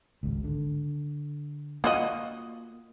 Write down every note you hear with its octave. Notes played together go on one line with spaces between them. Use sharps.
G#1 C#2
D3
A#3 F4 F#4 D#5